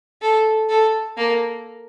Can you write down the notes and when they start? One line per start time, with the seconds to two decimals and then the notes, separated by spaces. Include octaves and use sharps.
0.22 A4
0.70 A4
1.18 A#3